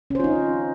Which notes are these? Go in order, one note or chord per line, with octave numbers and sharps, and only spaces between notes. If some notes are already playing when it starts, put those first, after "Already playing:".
C#4 D#4 F4 C5